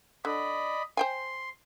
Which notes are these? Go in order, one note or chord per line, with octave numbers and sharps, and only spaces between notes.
D3 D5 D#5 B5
C5 G5 G#5 C6